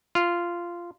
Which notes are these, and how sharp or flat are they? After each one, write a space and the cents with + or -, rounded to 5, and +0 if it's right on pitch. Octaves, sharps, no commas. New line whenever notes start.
F4 -10